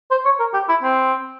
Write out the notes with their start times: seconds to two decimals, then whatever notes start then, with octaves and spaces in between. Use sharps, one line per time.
0.11 C5
0.25 C#5
0.40 A#4
0.54 G4
0.69 E4
0.83 C4